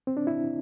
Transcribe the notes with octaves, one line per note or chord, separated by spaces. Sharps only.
C4
D4
E4